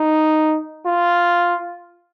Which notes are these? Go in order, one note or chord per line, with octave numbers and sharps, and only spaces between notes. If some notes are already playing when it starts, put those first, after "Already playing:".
Already playing: D#4
F4